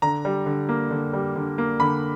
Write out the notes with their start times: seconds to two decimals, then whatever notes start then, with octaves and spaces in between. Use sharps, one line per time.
0.02 D3 A#5
0.25 G3
0.46 D3
0.69 A#3
0.91 D3
1.13 G3
1.36 D3
1.58 A#3
1.80 D3 B5